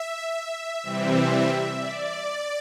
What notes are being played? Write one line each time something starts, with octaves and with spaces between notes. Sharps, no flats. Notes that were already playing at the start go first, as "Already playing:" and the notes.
Already playing: E5
C3 E3 G3 C4
D5